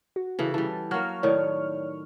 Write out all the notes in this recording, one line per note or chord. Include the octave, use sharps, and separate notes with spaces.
F#4
C#3 E3 A4
E3 G3 A5
F#3 A#3 C#6 F6
A2 D#3 C#5 D5